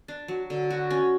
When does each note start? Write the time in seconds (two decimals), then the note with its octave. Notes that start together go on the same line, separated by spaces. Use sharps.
0.08 D4
0.28 F#3
0.50 D3
0.71 F#4
0.90 C#4